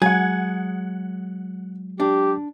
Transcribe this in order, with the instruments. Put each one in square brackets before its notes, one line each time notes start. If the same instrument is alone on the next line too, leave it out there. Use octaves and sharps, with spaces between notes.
[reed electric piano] F#3 G#3 [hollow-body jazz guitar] G#4 [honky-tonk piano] F#5 G#6
[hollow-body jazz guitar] D4 [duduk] G4